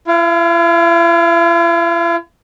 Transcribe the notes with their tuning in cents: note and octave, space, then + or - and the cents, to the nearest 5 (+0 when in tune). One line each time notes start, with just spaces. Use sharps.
E4 +45 F5 +0